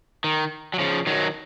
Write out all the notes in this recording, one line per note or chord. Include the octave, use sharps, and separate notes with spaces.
D#3
F#3
C#3 F3
D#3 F#3